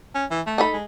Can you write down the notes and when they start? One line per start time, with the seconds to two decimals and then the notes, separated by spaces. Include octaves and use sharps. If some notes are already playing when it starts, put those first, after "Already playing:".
0.15 C#4
0.31 E3
0.46 A3
0.58 D#4 A4 B5
0.73 G#3